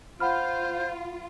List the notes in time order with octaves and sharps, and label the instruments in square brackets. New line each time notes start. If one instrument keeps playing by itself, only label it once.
[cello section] F4 [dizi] C5 [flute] F5 [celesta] F#5 B5 F6